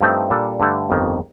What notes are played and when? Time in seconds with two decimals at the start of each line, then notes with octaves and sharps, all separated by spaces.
0.01 G2 F3 A3 C4 D#4
0.30 A#2 G3 D4 A4
0.60 G2 D3 A3
0.90 G1 F2 D#3